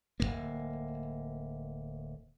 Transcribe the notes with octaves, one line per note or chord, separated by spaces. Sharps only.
D1 F2 A#3